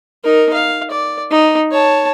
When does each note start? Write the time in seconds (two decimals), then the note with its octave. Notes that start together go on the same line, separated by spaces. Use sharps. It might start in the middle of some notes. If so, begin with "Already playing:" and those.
0.24 D#4 A#4
0.53 F5
0.91 D5
1.31 D#4
1.72 C#5 A5